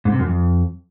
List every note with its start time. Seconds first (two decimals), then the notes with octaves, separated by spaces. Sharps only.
0.05 G#2
0.12 C3
0.19 F#2
0.26 F2